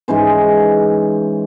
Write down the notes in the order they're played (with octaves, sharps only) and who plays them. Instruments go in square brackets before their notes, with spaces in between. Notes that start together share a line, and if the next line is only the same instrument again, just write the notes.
[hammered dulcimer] G#2 E3 C#4 C5